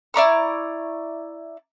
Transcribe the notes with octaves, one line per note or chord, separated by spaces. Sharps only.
E4 D5 A#5 C#6